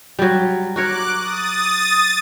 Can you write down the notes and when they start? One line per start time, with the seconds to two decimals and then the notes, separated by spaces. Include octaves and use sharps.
0.19 F#3 G3
0.76 F#4 A#4 C#5 D6 F#6
1.18 D#6 A6